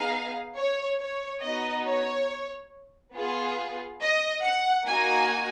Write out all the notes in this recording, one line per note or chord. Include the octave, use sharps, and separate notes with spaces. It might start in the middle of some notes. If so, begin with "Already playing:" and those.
Already playing: B3 D#4 G#4 F5
C#5
C#5
B3 D#4 F#4 D#5
C#5
B3 F4 G#4
D#5
F#5
A#3 D#4 F#4 G#5